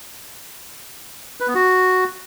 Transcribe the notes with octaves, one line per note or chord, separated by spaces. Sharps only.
B4
B3
F#4